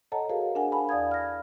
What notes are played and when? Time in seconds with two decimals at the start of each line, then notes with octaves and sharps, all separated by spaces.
0.12 A4 C#5 D#5 F#5 A5 A#5
0.29 F#4 G#4 A#4 C5 F5
0.55 D4 A#4 F#5 G#5
0.72 F5 F#5 G#5 A5 B5
0.89 E2 D5 F5 D#6 G#6
1.11 F6 A#6